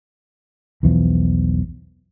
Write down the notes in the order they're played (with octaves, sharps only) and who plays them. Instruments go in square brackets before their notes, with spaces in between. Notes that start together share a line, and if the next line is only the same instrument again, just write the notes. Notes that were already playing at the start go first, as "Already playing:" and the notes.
[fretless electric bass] B1 E2 E3 F3